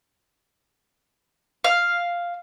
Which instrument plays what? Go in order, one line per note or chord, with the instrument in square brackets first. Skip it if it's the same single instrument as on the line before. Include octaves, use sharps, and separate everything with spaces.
[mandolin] F5